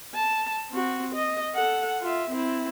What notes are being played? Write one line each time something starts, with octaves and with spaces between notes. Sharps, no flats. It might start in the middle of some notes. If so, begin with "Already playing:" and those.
A5
C4 F#4
D#5
A4 F#5
F4 E5
C4 E4